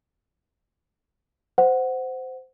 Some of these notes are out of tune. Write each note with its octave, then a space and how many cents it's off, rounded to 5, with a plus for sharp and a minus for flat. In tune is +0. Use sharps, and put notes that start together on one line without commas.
C5 -15 F#5 +0